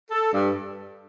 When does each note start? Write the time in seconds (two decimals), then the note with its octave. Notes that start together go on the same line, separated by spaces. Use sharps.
0.11 A4
0.33 G2